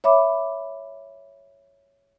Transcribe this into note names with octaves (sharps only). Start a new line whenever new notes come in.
C#5 E5 B5 D6